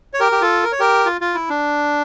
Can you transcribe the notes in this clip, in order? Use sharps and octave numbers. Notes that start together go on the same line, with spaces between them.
C#5
G4 A#4
G4
F4 A4
A#4
C#5
G4 A#4
F4
F4
E4
D4